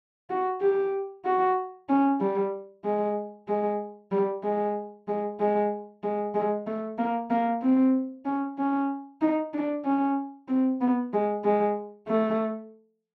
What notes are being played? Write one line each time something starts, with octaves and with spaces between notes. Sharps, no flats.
F#4
G4
F#4
C#4
G3
G#3
G#3
G3
G#3
G#3
G#3
G#3
G#3
A3
A#3
A#3
C4
C#4
C#4
D#4
D4
C#4
C4
B3
G#3
G#3
A3